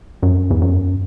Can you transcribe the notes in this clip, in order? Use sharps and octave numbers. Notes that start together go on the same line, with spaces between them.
F#2
E2
F#2